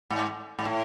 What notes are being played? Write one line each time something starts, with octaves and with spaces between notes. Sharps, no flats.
G#2
G#2
A2